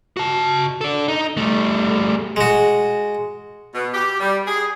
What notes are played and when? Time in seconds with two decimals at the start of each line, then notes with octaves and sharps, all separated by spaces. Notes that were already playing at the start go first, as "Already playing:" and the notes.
0.17 F#4 A5
0.81 A4 D5
1.08 D#4
1.37 G3 A3
2.36 G#3 F#4
3.75 B2
3.94 G4
4.20 G3
4.47 G#4